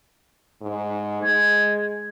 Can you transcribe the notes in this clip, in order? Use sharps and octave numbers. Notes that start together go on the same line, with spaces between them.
G#2
G#3 G#6